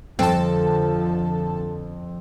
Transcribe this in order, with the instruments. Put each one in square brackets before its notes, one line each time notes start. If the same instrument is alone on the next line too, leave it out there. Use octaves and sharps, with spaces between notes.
[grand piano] F2 [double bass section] D3 F3 [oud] C4 [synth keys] A4 A5